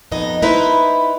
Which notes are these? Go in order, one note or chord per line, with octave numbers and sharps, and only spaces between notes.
F2 B3 D#4 D#5
D#4 E4 B4 C5